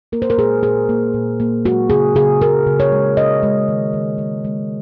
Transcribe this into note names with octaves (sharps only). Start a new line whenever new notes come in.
A#3 A#4
C5
A#4
A#2 G#4
A#2 G#4
A#3
A#2
A#3
G#3 F#4
C#3 G#4
C#3 G#4
C#3 A#4
C#3
C#5
G#3
G#3 D#5
G#3
D#3
D#3
G#3
G#3